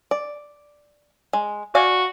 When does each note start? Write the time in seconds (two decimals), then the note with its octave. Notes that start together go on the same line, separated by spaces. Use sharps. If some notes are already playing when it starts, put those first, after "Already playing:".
0.11 D5
1.33 G#3
1.75 F#4 D5 F5 G#5